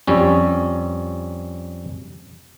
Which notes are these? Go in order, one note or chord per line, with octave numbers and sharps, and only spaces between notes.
F2 G3 C#4